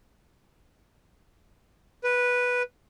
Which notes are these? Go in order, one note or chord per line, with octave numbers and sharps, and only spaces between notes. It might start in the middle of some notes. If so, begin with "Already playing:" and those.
B4